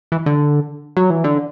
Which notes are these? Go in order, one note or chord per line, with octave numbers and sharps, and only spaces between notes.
E3
D3
F#3
E3
D3